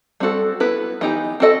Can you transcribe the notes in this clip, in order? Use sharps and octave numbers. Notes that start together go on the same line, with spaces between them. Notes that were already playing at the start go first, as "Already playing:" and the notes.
G3 C4 F#4 A4
B3 E4 B4
E3 B3 D#4 G4
C4 F#4 A4 D#5